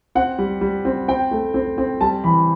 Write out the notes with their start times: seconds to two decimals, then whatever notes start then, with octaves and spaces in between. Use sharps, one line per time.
0.15 C4 F#5
0.38 G3
0.61 G3
0.85 C4
1.08 C4 G5
1.31 A3
1.54 C4
1.78 C4
2.01 G3 A5
2.24 E3 B5